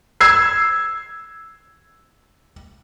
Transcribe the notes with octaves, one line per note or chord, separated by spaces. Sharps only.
E6 G#6 C7